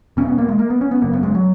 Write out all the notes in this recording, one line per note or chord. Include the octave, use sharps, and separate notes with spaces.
E1 E2 B2 C#4
B3
A#3
G#3
A#3
B3
C#4
B3
G#1 F#2 C#3 A#3
B3
G#3
F#3